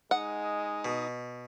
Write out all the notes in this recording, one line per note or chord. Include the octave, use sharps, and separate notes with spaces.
G#3 D#4 F#5
B2